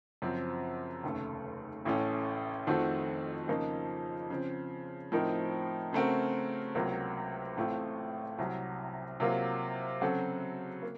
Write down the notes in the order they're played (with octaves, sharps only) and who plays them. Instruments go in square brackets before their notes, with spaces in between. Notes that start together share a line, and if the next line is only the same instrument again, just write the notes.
[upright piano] F#2 C#3 F3 C4
F1 D#2 C#3 A3
A1 A2 A3 C#4
F2 D#3 A3 C4 F#4
F2 C#3 F3 A#3 D#4
C#3 F3 C4
A2 F3 C4 D#4 A#4
C#3 A3 C4 F#4 A#4
C#2 C3 F#3 A#3
A1 A2 A3 C4 F4
C2 C3 F#3
C3 F#3 A#3 F4
C#3 F#3 C4 F#4 A4
A#3